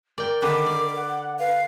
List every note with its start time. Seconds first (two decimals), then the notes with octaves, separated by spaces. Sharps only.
0.18 A#4 D5 G5
0.42 D3 D#3 B4 D6
0.66 D5
0.95 F#5
1.39 B4 F5